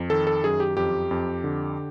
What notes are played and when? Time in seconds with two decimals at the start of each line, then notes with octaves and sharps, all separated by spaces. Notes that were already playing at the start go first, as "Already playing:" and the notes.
Already playing: F2
0.10 D#3 A4
0.27 A4
0.44 F#2 G#4
0.60 G4
0.77 F2 G4
1.11 F2
1.44 D3